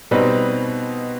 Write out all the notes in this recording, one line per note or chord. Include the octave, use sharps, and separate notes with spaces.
B2 G3 C4 D#4 B4